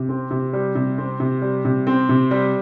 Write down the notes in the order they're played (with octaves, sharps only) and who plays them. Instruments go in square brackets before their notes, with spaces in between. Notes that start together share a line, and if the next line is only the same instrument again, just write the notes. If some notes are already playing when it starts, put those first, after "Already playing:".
Already playing: [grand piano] C3
C4
C3
G3
C3
C4
C3
G3
C3
C4
C3
G3